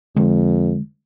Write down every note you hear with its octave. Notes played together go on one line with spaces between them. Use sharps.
F2 D3 G#3